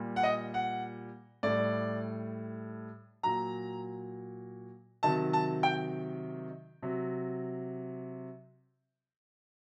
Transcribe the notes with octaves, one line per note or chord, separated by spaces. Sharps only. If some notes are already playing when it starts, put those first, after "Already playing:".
Already playing: A#2 G3
F#5
D#5
F#5
A2 G3 D5
A#2 F#3 A#5
C3 D#3 F#3 A5
A5
G5
C3 F#3